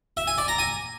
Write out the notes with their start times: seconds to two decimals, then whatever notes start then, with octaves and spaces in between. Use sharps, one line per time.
0.17 E5
0.27 G#5
0.38 D5
0.48 A#5
0.59 G#5